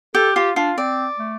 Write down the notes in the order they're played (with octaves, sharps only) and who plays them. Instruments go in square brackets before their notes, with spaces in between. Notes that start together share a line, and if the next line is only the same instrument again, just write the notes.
[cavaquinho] G4 [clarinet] A4
[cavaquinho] F4 [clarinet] G4
[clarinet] D4 [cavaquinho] F4
[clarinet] C4 [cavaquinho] D5
[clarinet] A3